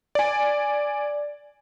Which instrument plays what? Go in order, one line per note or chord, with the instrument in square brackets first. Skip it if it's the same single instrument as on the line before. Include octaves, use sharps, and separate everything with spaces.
[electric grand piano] D5 G#5